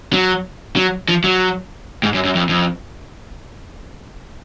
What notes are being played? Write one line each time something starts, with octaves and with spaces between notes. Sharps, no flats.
F#3
F#3
F3
F#3
G#2
F#2
F#2
F2
F2